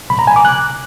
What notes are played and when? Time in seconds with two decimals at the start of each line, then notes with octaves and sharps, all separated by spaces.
0.10 B5
0.19 A#5
0.27 G#5
0.36 D6
0.45 F#6